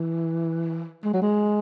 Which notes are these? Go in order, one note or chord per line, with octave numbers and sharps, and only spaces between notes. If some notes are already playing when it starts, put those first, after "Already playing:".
Already playing: E3
G#3
F#3
G#3